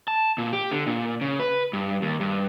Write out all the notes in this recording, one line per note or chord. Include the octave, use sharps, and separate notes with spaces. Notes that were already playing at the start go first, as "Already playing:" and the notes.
A5
A#2
G4
D3
A#2
C#3
B4
G2
D#2
G2